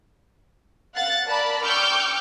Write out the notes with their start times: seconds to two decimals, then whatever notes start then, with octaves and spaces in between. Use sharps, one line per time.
0.94 F5 F#5 F#6 A6
1.25 A#4 D5 A5 B5
1.63 G5 C#6 D6 E6 F6 G6